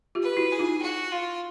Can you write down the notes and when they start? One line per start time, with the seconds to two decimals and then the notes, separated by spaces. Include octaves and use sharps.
0.15 F4 G4
0.22 B4
0.37 E4 F#4
0.52 G#4
0.59 D#4 F4
0.82 F#4
1.12 F4